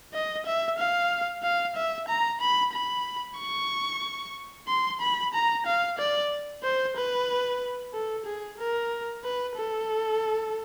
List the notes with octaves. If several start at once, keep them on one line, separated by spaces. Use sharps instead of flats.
D#5
E5
F5
F5
E5
A#5
B5
B5
C#6
C6
B5
A#5
F5
D5
C5
B4
A4
G#4
A#4
B4
A4